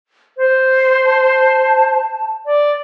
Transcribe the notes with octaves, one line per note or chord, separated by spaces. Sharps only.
C5
A5
D5